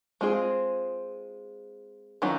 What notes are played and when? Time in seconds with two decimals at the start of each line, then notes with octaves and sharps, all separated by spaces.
0.21 G#3 C4 F4 G#4
2.22 D#3 F#3 C#4 F4